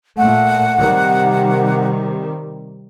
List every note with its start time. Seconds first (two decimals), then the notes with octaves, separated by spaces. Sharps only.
0.18 A#2 A3 F#5
0.77 C3 D#3 G3